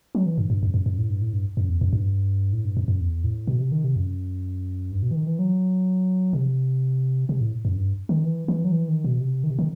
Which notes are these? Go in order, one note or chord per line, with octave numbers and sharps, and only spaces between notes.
F#3
E3
G2
G2
F#2
F#2
F#2
A2
G2
A2
G2
F#2
E2
F#2
G2
A2
G2
F#2
F#2
E2
A2
B2
C3
D#3
C3
F#2
G2
B2
E3
D#3
E3
F#3
C3
C3
A2
F#2
G2
D#3
E3
E3
F#3
E3
D#3
B2
C3
D#3
C3
D#3